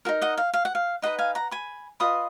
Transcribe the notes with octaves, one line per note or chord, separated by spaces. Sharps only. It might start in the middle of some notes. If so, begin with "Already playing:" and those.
D#4 F#4 A#4
D#5 F#5
F5
F5
F#5
F5
D#4 G#4 B4 D#5 F#5
F5 G#5
F#5 A#5
G#5 B5
F4 B4 D#5 B5 D#6